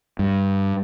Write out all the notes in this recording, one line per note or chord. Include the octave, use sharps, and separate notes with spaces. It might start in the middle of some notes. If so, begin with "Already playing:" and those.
G2